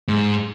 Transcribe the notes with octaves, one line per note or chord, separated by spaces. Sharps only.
G#2